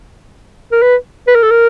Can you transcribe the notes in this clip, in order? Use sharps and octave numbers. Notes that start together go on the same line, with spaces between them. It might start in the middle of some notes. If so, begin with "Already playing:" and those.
A#4
B4
B4
A#4
A4
A#4